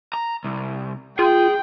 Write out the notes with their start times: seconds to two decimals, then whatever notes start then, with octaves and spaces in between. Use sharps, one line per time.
0.14 A#5
0.44 C2
1.19 F4 G#4 G5